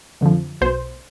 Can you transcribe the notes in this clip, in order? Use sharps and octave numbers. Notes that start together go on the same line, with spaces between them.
F2 D3 F3
B1 B2 C5